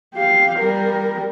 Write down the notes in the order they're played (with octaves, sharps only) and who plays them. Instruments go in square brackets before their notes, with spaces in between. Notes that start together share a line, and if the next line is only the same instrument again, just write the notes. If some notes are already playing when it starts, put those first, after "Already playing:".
[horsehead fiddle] G4 F5
G3 A#4